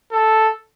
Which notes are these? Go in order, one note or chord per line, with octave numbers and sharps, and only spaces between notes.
A4